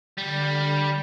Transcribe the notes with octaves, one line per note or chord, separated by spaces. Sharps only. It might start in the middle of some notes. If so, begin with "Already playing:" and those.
D3 G3 F6 A#6